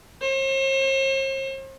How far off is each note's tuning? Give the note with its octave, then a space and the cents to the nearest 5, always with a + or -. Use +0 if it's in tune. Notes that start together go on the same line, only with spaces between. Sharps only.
C5 +45